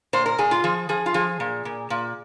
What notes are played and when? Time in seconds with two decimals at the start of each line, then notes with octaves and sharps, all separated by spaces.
0.13 A#2 C5
0.26 A#4
0.38 A#2 G#4
0.51 F4
0.64 F3 G#4
0.89 F3 G#4
1.06 F4
1.14 F3 G#4
1.40 A#2
1.65 A#2
1.90 A#2